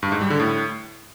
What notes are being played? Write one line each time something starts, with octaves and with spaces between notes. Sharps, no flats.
G2
G#2
G3
D3
A2